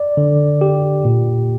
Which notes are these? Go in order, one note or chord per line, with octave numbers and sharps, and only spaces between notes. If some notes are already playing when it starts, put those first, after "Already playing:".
Already playing: D5
D3
G4
A#2